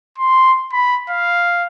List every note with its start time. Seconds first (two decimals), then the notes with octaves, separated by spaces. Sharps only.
0.18 C6
0.73 B5
1.10 F5